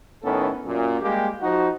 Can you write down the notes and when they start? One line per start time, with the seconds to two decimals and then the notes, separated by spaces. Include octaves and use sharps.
0.24 A2 D#3 B3 C#4 A4
0.65 F#2 A#2
1.02 G3 G#3 A#3 G4
1.41 F3 D#4 F#4